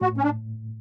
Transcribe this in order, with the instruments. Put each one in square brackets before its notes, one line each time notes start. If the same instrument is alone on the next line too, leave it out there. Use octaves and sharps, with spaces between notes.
[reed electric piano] A2 [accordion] F#4
[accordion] C#4
D4